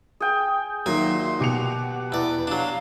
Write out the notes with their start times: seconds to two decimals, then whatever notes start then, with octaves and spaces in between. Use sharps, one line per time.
0.20 G#4 G5
0.86 A#2 D#3 F#3 E5 G#5 C6
1.40 B2 G4 F#5 C#7 F7
2.12 E2 B4 D5
2.47 F#3 D4 F5